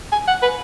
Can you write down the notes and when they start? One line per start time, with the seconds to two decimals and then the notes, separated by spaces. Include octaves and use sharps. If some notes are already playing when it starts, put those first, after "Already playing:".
0.12 G#5
0.28 F#5
0.42 B4